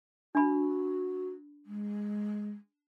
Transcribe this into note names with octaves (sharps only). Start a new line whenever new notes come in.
D4 F#4 B5
G#3